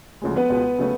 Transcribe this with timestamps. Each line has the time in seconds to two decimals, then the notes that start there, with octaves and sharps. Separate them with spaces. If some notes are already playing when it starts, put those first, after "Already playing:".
0.22 D2 C#3 F3 G#3
0.36 B3 B4
0.50 C#2 B2 G#3
0.79 C#3 F#3 A3